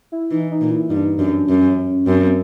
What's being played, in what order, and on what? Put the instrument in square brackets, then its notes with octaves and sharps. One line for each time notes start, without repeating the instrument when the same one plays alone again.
[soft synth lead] E4
[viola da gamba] E3 [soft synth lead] D#4
[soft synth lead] D#4
[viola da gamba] A#2
[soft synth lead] E4
[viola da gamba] G2 [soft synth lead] D#4
[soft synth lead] D4
D#4
[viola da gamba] F#2 [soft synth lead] D4
[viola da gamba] F#2 [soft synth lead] C#4
[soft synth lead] C#4
[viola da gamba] F#2 [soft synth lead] C4
[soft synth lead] C4